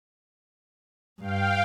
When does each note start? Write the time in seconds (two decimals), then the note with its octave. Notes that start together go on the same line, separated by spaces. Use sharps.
1.20 G2 F5 G5